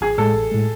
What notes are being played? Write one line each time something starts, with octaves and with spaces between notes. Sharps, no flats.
A1 G#4
A2 G#3 A4
A1
A2 G#3